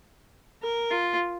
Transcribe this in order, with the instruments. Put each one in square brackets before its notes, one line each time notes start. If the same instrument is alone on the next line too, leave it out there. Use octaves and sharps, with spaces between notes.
[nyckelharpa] A#4
F4